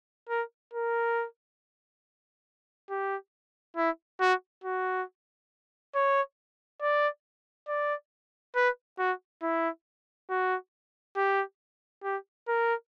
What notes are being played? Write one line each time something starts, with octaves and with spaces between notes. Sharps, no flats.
A#4
A#4
G4
E4
F#4
F#4
C#5
D5
D5
B4
F#4
E4
F#4
G4
G4
A#4